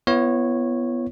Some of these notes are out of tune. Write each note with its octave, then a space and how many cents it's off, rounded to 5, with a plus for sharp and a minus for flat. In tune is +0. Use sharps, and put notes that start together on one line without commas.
B3 +0 E4 +40 C#5 -10